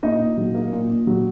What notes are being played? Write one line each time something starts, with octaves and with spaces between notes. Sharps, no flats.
A#2 D#4 D#5
A#2
F#3
A#3
A#2
A#2
F#3